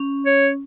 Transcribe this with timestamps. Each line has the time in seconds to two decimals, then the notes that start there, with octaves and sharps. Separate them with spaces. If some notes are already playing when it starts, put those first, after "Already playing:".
Already playing: C#4
0.26 C#5